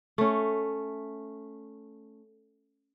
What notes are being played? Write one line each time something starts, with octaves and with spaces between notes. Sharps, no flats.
A3 C#4